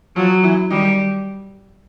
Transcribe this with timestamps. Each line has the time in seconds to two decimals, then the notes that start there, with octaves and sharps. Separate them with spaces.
0.16 F3 F#3 F4
0.43 E3 E4
0.70 D#3 G3 D#4